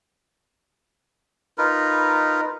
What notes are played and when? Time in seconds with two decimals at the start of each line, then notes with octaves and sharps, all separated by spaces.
1.58 D#4 F4 A#4 B4